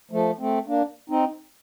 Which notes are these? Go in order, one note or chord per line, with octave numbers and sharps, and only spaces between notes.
F3 A3
A3 C4
A#3 D4
C4 D#4